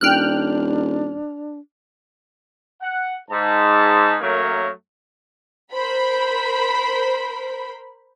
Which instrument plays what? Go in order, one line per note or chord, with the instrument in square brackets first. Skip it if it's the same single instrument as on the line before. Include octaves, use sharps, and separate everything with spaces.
[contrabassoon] D#1 [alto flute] D4 [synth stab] G5 F6 F#6
[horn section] F#5
G#2 A5
F#2 F#3 A3 A#3 A#4 C#5
[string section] A#4 C5 B5